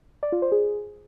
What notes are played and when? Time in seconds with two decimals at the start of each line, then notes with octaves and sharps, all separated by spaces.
0.23 D5
0.32 F4
0.42 C5
0.52 G#4